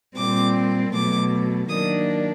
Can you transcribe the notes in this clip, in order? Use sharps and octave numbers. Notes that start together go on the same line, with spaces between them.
A#2 G3 C4 D6
B2 F#3 A3 D6
D#3 F#3 A#3 D4 D#6